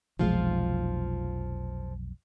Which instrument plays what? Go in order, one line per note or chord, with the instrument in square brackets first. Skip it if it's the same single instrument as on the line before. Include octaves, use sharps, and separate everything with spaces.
[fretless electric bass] F1 B1 G#3 [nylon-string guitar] F3 F4